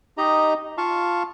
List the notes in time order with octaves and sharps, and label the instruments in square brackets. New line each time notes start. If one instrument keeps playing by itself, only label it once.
[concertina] D#4 G4 D#5 A#5
F4 F5 A5 C#6